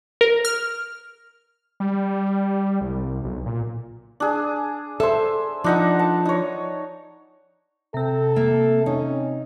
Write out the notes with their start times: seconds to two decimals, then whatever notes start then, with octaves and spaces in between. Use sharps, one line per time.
0.21 A#4
0.45 F6
1.80 G3
2.81 C2
3.24 B1
3.46 A#2
4.20 D4 G#4
5.00 A4 C5 E5
5.64 F3 D4 D#4 F#5
5.99 A5
6.25 D#4 C#5
7.94 C3 C4 A4
8.36 A#3 E5
8.86 C#4 D#4